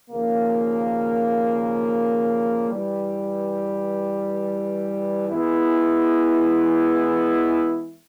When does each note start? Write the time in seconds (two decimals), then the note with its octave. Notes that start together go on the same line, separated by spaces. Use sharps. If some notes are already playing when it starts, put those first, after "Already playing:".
0.10 D#2 C#3 F3 A#3
2.69 G2 E3 G3
5.29 E3 G#3 B3 E4